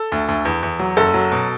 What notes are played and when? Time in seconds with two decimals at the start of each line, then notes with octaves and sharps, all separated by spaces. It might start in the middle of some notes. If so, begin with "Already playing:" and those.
Already playing: A4
0.12 D2
0.29 D2
0.45 E2
0.63 E2
0.79 F#3
0.97 F#1 A4
1.14 F#3
1.32 B2